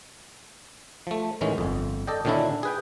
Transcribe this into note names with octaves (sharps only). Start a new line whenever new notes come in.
F3 A3
A2 D#3 E3 G#3 C#4
G1 F2
A4 D5 D#5 G5
A#2 D3 D#3 C#4 D4 E4
G#4 B4 G5